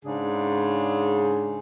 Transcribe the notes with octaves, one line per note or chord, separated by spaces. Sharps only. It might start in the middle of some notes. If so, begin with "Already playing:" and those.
G#2 C#3 D4 G#4